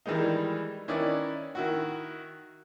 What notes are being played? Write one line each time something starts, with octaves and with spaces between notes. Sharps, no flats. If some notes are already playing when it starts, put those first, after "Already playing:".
D#3 E3 G3 G#3 D#4
D#3 C#4 D#4 E4 B4 D5
D#3 E4 F#4